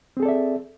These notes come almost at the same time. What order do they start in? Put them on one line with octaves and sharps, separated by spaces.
C4 G#4 A4 D5 E5